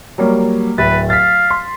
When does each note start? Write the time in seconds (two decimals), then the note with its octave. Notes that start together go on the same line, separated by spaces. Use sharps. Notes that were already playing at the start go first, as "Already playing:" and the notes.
0.18 F#3 G3 A#3
0.78 D1 B4 E5 A6
1.10 F5 A6 B6
1.51 C6